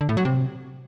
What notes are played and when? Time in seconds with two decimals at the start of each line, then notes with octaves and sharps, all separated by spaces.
0.01 D3
0.09 A2
0.17 F#3
0.25 C3